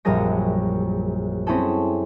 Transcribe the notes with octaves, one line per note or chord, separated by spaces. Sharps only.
A#1 F#2 G3 A#3 G#4 A#6
C4 C#4 E4 G#4 A4